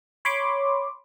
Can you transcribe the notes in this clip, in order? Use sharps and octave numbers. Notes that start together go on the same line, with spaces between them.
C#5 B5 C6 D6